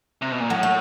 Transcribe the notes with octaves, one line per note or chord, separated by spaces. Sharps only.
C3
B2
A#2
A2 F#3
A3